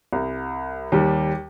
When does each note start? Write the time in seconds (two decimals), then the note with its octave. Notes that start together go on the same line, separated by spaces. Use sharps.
0.13 C2
0.92 D#2 G3